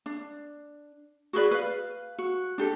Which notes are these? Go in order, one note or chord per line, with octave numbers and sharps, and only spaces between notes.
D4
F#4 G#4 B4 D5
B4 F5
F#4
D4 G4 A4